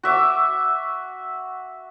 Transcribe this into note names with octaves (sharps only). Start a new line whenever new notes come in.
F#4 E5 D6